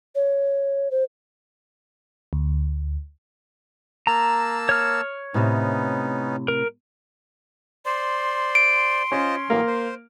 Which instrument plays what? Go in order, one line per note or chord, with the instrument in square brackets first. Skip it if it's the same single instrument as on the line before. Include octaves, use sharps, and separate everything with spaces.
[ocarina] C#5
C5
[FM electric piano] D2
[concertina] A#3 A5 E6 [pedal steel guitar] A#5
[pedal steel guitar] C#5 F6
[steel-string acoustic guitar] A2 C3 [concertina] B3 C#4 D#4
[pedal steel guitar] A#4
[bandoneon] C5 D5 [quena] C6
[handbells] D7
[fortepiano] C#4 [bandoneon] F4 C5 D#5
[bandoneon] A2 E3 F#3 [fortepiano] A#3 F5
[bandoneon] C5